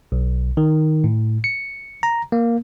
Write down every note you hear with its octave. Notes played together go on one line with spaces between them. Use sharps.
B1
D#3
A2
C#7
A#5
A#3